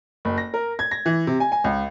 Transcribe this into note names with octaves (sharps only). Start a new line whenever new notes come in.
F#1
A#6
A#4
G#6
A#6
E3
C3
G#5
G#5
C#2